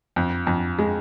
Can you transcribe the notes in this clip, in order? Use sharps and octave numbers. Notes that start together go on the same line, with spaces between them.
F2
F2
G#3